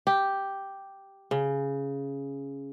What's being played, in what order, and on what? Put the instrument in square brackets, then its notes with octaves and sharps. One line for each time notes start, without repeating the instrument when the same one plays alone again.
[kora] G4
C#3